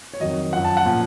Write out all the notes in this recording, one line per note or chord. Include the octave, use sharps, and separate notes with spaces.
C#5
F2 D#3 F#3 D#5
F#2 F3 F#5
A5
F#5
A#2 F3